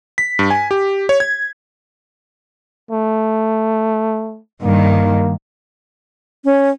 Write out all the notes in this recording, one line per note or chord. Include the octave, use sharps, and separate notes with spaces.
B6
G2
G#5
G4
C#5
G#6
A3
G2 D#3 A#3
C#4